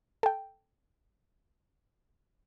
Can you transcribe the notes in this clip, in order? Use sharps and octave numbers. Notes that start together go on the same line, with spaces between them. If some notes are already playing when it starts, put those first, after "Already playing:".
A4 G5